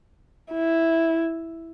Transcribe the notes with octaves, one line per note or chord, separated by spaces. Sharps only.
E4